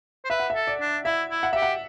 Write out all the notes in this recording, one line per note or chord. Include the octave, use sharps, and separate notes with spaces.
C5
B4 E5
F#5
E5
A4
D5
D4
E4 E5
E4
F#5
G4 E5
F#5